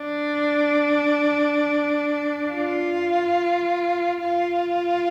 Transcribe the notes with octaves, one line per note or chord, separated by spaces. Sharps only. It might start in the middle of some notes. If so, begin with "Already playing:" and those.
Already playing: D4
F4
F4